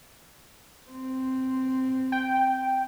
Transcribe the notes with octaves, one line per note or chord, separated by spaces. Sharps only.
C4
G5